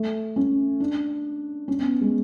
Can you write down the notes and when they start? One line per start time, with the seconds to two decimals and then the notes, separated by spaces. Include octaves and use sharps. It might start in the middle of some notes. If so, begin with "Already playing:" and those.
Already playing: A3
0.36 C#4
0.80 D4
1.68 C#4
1.79 B3
2.01 G#3